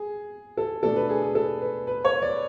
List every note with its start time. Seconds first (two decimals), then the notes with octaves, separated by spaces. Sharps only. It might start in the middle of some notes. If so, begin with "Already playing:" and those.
Already playing: G#4
0.57 A4
0.83 B2 A3 D4 A4
0.96 B4
1.09 G#4
1.22 G#4
1.35 A4
1.61 B4
1.87 B4
2.05 C#5
2.22 D5